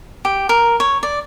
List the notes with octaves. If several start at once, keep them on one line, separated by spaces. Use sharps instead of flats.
G4
A#4
C#5
D5